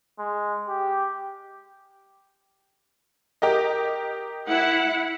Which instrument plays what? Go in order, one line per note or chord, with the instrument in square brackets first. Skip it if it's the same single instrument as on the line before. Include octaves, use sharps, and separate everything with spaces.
[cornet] G#3
G4
[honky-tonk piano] G4 A#4 D#5
[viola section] E4 F#5